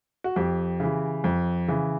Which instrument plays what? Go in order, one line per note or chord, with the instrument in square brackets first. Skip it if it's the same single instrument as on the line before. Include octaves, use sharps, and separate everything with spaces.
[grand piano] F#4
F2 G4
C#3 E3
F2
C#3 E3